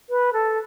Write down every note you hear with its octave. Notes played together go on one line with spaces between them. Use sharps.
B4
A4